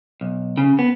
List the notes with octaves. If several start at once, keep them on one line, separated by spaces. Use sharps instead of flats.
B1
C#3
B3